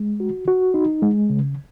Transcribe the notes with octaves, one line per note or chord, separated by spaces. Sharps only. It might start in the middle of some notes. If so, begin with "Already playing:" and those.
Already playing: G#3
F#4
F#4
D#4
G#3
C#3